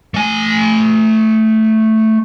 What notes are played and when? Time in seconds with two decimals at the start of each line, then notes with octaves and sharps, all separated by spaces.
0.14 A3 G#5